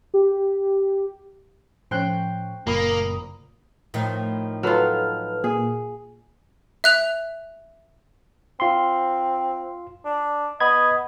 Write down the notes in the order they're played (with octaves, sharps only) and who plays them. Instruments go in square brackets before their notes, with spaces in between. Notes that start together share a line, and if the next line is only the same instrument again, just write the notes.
[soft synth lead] G4
[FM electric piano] A2 F3 C#4 [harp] C5 G5 F#6
[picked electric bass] F#1 A#2 [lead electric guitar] A#3 [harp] A#4 [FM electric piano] A#5 B5 D#6
[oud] A2 D#3 F3
[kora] F#3 F4 [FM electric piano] A4 B4 F6
[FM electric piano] A#2 [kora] G#4
[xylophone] E5 F#6 F7
[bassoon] C4 [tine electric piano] F4 C6
[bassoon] D4
[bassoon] B3 [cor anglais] D#5 [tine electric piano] B5 G#6